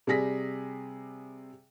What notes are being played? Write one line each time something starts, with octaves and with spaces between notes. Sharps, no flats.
C3 G3 G#4 A#6 B6